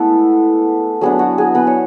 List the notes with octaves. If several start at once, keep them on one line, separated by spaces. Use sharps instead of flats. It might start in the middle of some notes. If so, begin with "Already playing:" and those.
Already playing: G#3 A3 B3 E4 A4
F#3 B3 D4 G#4
F#4
G#4
B3 B4
C#5